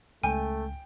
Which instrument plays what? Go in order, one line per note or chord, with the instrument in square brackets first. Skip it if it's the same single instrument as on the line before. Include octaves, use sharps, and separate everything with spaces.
[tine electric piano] C#2 [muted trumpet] A3 [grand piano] G5 [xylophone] G#5